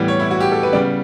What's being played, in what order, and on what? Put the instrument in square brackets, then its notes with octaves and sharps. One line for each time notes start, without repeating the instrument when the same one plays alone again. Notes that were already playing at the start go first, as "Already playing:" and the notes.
Already playing: [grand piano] A2 E3 G3 B3
C#5
E4
F#4
G4
A4
B4
C#3 G3 B3 D5